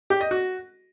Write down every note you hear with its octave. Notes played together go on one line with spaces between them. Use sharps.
G4
D#5
F#4